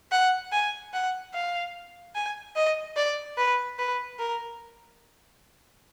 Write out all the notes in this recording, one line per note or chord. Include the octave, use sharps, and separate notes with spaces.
F#5
G#5
F#5
F5
G#5
D#5
D5
B4
B4
A#4